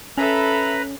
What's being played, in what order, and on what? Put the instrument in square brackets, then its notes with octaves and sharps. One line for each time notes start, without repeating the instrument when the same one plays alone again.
[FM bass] C#4 [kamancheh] A4 E5 [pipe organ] B4 A#5 B5